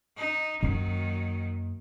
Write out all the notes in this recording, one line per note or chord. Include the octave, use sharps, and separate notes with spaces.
D#4
F#2 D#3 F#3 A#3